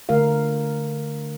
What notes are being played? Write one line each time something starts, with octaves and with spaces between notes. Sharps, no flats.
D3 A3 A#4 F5